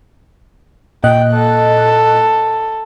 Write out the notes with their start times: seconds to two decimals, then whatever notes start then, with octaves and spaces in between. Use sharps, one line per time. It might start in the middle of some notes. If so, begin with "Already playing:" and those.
1.04 A#2 D#5 G5 F#6
1.33 A4